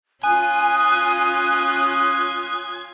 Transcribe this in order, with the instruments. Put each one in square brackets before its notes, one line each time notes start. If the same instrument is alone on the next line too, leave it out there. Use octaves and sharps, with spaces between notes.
[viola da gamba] C#4 F4 [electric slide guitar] G#5 [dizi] D#6 [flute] F#6